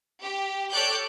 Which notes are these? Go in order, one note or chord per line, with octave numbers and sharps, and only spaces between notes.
G4
A4 C#5 D5 D6 F#6 G6